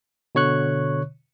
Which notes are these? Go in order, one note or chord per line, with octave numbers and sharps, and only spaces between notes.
B2 D3 C#5 C#6 F#6